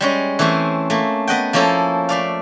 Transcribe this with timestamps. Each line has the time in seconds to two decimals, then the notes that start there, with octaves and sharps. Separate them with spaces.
0.01 G3 G#3 C#4
0.39 E3 A3 C4 C#4 C5
0.90 A3 A#3
1.28 B3 D#5 F#5 G5
1.53 F3 A#3 C#4 E4 A4
2.09 A3 D5 F5